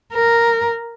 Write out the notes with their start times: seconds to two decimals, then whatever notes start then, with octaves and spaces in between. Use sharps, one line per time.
0.13 A#4